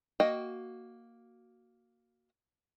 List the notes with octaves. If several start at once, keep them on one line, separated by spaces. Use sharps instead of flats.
A#3 F#4 D#5 G5